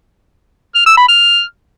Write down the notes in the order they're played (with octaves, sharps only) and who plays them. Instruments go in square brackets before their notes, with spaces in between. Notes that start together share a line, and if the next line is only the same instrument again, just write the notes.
[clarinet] F6
E6
B5
F6